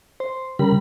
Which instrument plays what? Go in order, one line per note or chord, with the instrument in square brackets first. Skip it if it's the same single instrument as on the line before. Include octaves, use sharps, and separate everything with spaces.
[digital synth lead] C5
[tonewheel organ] C#3 A#4 B5 [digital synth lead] G3